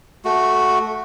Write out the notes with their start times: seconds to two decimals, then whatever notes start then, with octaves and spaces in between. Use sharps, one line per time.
0.25 A3 F#4